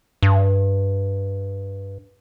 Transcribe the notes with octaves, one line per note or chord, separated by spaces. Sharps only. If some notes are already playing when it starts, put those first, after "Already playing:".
G2